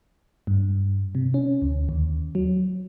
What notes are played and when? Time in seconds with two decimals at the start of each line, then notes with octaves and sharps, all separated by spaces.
0.47 G2
1.15 C3
1.34 C#4
1.62 D2
1.89 D#2
2.35 F#3